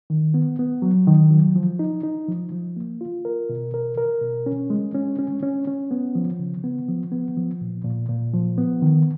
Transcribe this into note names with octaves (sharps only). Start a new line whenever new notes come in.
D#3
B3
B3
F#3
D#3
F#3
F3
D#4
D#4
F3
F3
A#3
F4
A#4
B2
A#4
A#4
B2
C#4
G#3
C#4
C#4
C#4
C#4
B3
F3
C#3
B3
F3
B3
F3
A#2
A#2
A#2
F3
B3
D#3